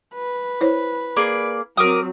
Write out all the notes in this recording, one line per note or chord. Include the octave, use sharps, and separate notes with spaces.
B4
E4 C5 C#5
A#3 G#4 D5
F#3 C4 A#4 D6 D#6